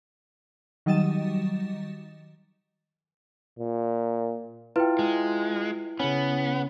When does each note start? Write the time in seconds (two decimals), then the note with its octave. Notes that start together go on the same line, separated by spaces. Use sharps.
0.86 D#3 F#3 G3 D#5 A6 E7
3.59 A#2
4.76 E4 F4 B4 G5
4.99 G#3
5.99 C#3 B3 C#4